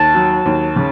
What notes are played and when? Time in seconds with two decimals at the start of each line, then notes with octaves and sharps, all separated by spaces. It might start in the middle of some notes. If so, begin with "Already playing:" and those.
Already playing: D#2 A5
0.15 F#3
0.46 D#2
0.76 C#3